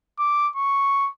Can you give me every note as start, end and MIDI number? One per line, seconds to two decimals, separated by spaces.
0.19 0.50 86
0.56 1.10 85